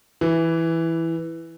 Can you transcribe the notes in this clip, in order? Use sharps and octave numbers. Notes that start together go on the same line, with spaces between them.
E3